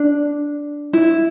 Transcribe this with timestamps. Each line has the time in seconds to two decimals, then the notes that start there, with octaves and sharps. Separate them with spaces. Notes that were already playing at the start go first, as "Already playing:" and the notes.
Already playing: D4
0.93 E4